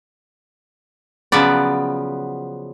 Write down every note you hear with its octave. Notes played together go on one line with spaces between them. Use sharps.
C#3 F3 F#3 B3 D5